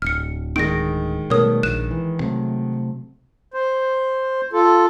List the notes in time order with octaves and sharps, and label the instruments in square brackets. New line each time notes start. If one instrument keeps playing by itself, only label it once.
[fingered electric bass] D1 [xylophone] F6 C#7
[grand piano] D#3 G#3 [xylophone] A#6 D7
[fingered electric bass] B2 G3 A3 [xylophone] A#4 C#5 D#6
[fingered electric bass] A#1 [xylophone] F#6 E7
[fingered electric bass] E3
C3 F#3 A3
[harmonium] C5
F4 A4